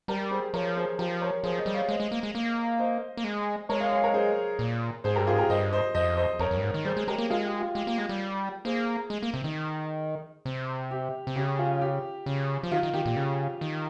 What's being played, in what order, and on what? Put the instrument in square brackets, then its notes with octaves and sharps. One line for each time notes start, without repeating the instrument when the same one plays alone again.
[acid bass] G3 [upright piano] G4 A#4
[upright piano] G#4 C5
[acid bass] F3 [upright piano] A#4 C#5
[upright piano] G#4 C5
[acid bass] F3 [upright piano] G4 A#4
[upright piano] A#4 C#5
[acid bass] F3 [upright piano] G#4 C5
[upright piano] C5 D#5
[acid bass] G3
[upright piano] C#5 F5
[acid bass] G#3 [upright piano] C5 D#5
[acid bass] G#3
A#3
G#3
A#3
[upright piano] C5 D#5
[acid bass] A#3
G#3
[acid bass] G#3 [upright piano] A#4 C#5
[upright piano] C#5 F5
C#5 F5
A#4 C#5
G#4 C5
[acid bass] A#2
[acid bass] G#2 [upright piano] G#4 C5
[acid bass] G2 [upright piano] G4 A#4
[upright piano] F4 G#4
[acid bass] G#2
[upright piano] G4 A#4
[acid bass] G2 [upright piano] C5 D#5
[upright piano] C5 D#5
[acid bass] F2 [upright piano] C5 D#5
[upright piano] C5 D#5
[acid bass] F2 [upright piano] A#4 C#5
[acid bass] F2
G2
G#2
D#3
[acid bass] G3 [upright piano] G#4 C5
[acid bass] G#3
[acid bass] G#3 [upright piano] G4 A#4
[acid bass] A#3
[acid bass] G#3 [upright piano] F4 G#4
[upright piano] G4
F4
[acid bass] G#3 [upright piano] G4
[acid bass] A#3
G#3
G3
[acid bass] A#3 [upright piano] G#4 C5
[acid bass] G#3
A#3
C3
D#3
C3
[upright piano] G4
[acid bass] C3
[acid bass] C#3 [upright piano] G4
[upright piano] F4
G4
[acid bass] C#3
F3
[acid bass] D#3 [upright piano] F4
[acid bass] D#3
[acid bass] D#3 [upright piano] G4
[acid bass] A#2
C#3
D#3